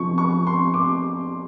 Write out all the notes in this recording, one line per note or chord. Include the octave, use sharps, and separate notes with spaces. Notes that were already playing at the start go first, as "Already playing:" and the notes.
Already playing: F2 C3 F3 C#6
C#6
C6
D6